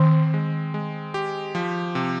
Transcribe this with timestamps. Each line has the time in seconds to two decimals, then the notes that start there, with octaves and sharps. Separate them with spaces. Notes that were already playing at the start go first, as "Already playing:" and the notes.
Already playing: D#3 C4
0.34 G#3
0.74 G#3
1.14 G4
1.55 F3
1.95 C3